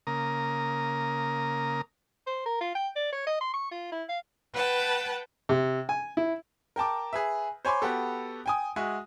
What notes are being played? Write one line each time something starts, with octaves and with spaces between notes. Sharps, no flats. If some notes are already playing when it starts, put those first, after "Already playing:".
C#3 A#3 A#4 A#5 D#6
C5
A#4
F4
G5
D5
C#5
D#5
C6
C#6
F4
E4
F5
B4 F#5 G5 A5
C3
G#5
E4
A#4 G5 A5 D6
G#4 B4 E5
C5 C#5 G#5 B5 C6 D6
B3 F#4 G4 A4
G5 G#5 D#6
G#3 F#4 E5 G#5